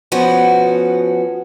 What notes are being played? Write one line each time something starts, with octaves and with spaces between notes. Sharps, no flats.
F3 B3 C#4 F#4